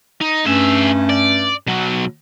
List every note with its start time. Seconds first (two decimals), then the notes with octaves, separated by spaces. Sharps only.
0.21 D#4
0.45 G2 A3 C#4 G#4 E5
1.09 D5
1.67 B2 F#3